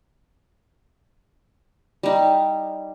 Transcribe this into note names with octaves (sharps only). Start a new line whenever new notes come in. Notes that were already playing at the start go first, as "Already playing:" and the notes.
G3 D#4